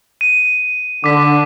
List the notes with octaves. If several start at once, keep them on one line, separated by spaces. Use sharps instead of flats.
D#7
D3 D6 B6